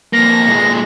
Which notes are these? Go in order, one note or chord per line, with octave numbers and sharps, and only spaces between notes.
F2 A#3 A#6
A#2 G#3